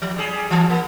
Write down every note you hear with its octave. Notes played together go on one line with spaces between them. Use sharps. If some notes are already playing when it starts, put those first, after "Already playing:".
F3
G3 G#4
E3
A#3